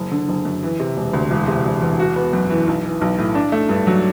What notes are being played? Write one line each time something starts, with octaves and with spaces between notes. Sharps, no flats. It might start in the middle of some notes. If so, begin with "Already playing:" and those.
Already playing: F#1
D3
F#1
F#2
E3
C3
E1
D2
E1
C3
E1
E2
F#4
B3
F#2
E3
B1
E3
B1
A2
D4
A3
G2
F#3